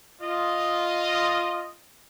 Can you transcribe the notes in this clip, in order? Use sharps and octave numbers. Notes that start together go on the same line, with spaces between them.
F4 D#5